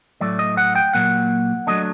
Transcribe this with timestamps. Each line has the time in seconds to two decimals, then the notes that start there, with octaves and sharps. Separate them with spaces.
0.21 A2 F#3 A3 D5
0.39 D#5
0.57 F#5
0.75 G5
0.93 A#2 F#3 A#3 F#5
1.67 F#3 A3 D4 D#5